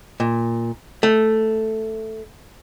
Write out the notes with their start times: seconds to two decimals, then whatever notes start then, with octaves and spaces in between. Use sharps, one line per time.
0.20 A#2
1.03 A3